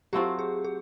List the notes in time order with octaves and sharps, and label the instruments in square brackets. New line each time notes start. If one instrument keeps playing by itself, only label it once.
[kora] F#3 A3 C4 F4 [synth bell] G4
[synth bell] G#4
G#4